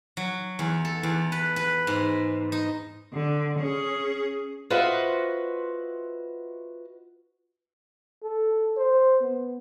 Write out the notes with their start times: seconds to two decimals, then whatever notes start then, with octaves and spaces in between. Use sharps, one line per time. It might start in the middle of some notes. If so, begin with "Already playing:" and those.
0.17 F#3
0.59 E2
0.85 A4
1.03 E2
1.32 B4
1.56 B4
1.87 G#2
2.52 D#4
3.13 D3
3.59 C#4 G#4
4.70 F4 F#4 B4 C5 D#5 E5
8.23 A4
8.77 C5
9.21 B3